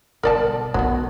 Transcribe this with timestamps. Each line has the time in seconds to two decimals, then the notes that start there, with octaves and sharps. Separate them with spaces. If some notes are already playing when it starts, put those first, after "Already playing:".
0.23 B2 G3 A#4 D5 A5
0.74 B1 B2 F#3 B3